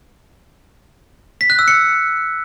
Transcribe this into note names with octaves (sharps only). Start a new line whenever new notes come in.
B6
F#6
E6
C#7